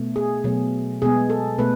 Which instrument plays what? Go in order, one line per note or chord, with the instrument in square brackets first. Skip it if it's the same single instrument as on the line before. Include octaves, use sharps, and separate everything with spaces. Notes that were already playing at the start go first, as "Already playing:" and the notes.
Already playing: [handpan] B2 A3
G#4
B2 F#3 A3
B2 G#3 B3 G#4
A4
B2 A3 B4